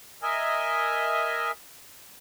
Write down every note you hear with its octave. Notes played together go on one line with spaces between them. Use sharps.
A#4 D#5 E5 G#5